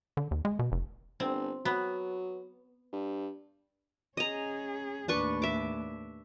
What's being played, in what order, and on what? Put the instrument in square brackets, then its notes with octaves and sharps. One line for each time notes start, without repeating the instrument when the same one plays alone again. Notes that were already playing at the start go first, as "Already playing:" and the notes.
[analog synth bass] D3
D#2
G#3
B2
F1
[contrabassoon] G1 [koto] C4
[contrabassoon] F#3 [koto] B3
[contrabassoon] G2
[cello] C#4 G#4 [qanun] D#5 A#5
[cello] D#2 A2 [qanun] D4 B4 C#6
[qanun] E5 D6